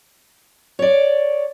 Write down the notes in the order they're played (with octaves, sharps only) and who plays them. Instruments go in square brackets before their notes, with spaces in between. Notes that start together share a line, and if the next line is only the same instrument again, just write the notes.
[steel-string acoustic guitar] C#5 D5